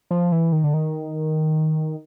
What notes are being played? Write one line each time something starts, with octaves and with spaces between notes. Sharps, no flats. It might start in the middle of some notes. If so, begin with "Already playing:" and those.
F3
E3
D#3
D3
D#3